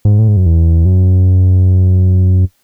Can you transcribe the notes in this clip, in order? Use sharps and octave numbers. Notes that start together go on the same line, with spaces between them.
G#2
A2
G#2
F#2
E2
F#2